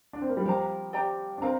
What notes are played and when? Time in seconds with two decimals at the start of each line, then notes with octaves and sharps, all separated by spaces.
0.13 D4
0.22 C4
0.29 A#3
0.37 G3
0.45 F3 G4 A#4 F5 A#5
0.93 G4 D5 G5 A#5
1.38 D4
1.42 C4 A#4 F5 A#5